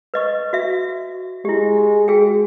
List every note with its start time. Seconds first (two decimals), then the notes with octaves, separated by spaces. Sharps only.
0.14 B4 D#5 C#6
0.53 F#4 E5
1.45 G#3 E4 G4
2.08 F#4 G#4 G5